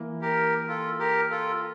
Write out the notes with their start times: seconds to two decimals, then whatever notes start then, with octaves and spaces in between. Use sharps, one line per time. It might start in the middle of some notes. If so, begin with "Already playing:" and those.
Already playing: E3 A#3 E4
0.22 G4 A#4
0.68 F4 A4
0.99 G4 A#4
1.30 F4 A4